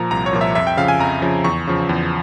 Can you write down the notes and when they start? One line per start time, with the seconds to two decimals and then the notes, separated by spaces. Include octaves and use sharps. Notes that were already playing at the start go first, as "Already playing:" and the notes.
Already playing: A#2 F3 A#5
0.11 C2 A#5
0.26 C#5
0.33 A#2 F3
0.41 E5
0.55 F2 E5
0.67 G5
0.77 C#3 F3 F5
0.88 G#5
0.99 F2 A#5
1.22 C#3 F3
1.44 E2 C#6
1.67 C#3 F3
1.89 E2